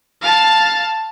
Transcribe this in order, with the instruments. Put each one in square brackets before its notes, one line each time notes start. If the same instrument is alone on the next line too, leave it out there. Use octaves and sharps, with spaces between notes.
[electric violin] F5 A5